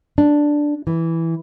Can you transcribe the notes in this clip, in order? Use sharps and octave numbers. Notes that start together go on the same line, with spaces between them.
D4
E3